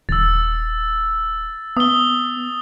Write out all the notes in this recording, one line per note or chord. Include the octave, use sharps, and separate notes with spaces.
D#1 E6 A6
B3 D#6 G7